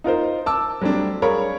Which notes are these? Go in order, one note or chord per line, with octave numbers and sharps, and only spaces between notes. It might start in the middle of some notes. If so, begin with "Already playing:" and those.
D#4 F4 A#4 C5
A5 D6 E6
F#3 G3 A3 C4 D4
G#4 A#4 C#5 D5 F5 B5